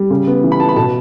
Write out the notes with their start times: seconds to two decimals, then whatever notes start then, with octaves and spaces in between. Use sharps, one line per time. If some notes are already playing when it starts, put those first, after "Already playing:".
Already playing: G3
0.10 C#3
0.27 B3
0.44 E3
0.52 B5
0.60 B3 A5
0.69 B5
0.76 B2 A5